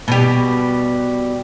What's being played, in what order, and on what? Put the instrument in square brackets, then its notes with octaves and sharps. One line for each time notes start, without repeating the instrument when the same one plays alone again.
[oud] B2 G3 G4